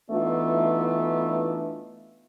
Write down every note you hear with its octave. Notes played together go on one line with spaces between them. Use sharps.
E3 A3 B3 D4 D#4 F4